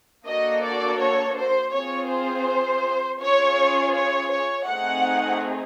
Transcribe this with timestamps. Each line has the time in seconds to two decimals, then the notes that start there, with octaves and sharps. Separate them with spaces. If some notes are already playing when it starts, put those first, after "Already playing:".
0.26 A#3 D4 F#4 A4 D#5
0.62 D5
0.99 C#5
1.37 C5
1.73 C4 F4 G#4 C#5
2.10 C5
3.21 C#4 F4 G#4 C#5
3.95 C#5
4.31 C#5
4.68 A3 C4 D#4 G#4 F#5